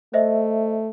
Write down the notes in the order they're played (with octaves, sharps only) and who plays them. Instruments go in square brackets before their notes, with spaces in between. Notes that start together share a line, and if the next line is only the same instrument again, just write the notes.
[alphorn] A3 [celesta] C5 D#5 E5